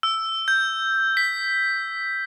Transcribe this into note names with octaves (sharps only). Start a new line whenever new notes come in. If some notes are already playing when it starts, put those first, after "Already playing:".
E6
G6
B6